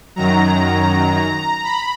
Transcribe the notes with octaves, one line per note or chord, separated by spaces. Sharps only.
F#2 D#3 F#3 A#5
B5